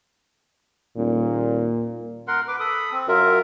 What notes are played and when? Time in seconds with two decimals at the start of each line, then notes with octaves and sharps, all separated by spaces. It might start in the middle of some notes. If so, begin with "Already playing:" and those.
0.97 D#1 A#2
2.28 A#4 F#5 C6
2.48 B4 D6
2.60 A4 B5 D#6
2.92 C4
3.08 F#2 F4 A#4 E5